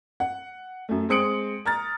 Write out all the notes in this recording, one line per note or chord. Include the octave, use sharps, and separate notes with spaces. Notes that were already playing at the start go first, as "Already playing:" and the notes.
F#5
F#2 A3
G#3 C4 D#6 C#7 D7 F#7
A#5 F6 A6